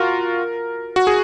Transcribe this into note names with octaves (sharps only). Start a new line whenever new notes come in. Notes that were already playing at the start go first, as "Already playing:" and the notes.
Already playing: F4 F#4 A#4
F#4
G#4